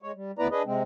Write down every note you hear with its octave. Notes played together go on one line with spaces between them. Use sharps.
G#3 C#5
G3
D2 B3 E4 B4 D5 A#5
D4 G#4 B4 D#5
C3 G#3 C4